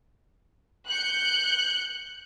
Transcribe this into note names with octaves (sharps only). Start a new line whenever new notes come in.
F#6 G6 C#7